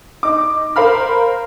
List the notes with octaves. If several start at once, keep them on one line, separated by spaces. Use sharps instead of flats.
D#4 D6
A#4 C5 F5 B5 F6